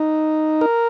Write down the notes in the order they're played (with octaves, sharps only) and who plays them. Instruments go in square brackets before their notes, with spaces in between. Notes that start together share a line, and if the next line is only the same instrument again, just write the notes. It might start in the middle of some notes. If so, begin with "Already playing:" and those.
Already playing: [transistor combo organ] D#4
A#4